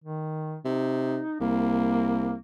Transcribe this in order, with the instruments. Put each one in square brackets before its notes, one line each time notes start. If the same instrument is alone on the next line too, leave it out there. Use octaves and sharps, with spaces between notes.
[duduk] D#3
[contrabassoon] C3 [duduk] D#4
[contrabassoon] C2 [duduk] A#3